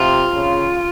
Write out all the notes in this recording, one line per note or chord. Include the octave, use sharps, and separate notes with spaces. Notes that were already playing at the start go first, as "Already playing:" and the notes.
Already playing: C3 F4
C#3